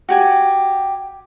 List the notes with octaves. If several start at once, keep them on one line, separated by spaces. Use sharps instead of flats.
F#4 G4 G#5